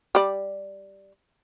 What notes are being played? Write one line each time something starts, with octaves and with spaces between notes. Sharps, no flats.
G3 D5